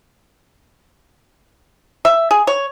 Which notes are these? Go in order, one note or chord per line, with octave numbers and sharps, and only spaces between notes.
E5
G#4
C#5